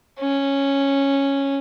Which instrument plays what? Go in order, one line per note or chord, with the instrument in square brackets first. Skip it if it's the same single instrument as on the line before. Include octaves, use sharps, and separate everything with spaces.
[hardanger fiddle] C#4